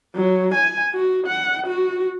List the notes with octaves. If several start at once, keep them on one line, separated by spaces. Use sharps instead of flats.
F#3
G#5
F#4
F#5
F#4